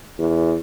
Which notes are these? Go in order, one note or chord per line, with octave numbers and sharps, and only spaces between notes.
E2